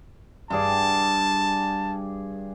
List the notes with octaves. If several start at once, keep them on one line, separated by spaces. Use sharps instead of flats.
G2 G#4 D5 A5